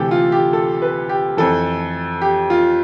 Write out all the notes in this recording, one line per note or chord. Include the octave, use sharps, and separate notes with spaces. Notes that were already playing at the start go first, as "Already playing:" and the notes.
Already playing: D2 C3 E3 G4 A4
F4
G4
A4
B4
G4
F2 E3 A4
G4
F4